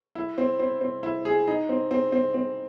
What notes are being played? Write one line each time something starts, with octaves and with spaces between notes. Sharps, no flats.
E4
C4
C4
C4
E4
G#4
D#4
C4
C4
C4
C4